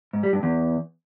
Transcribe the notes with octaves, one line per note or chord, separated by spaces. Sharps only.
G#2
G3
G2
E2